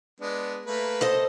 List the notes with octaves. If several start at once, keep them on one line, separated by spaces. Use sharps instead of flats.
G#3 B3 D4
A3 A#3 B4
A4 C5 D#5